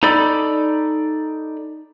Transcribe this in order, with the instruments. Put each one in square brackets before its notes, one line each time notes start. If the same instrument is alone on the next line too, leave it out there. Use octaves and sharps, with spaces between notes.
[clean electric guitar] D#4 A4 D5 B5